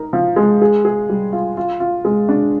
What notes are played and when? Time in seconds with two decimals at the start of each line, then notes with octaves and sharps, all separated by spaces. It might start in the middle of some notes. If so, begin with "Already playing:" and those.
Already playing: D#4 A#4
0.13 F3
0.36 G#3
0.62 G#4
0.85 G#4
1.09 G3
1.32 F4
1.57 F4
1.80 F4
2.05 G#3
2.29 D4